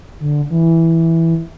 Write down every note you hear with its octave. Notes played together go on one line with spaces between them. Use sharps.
D3
E3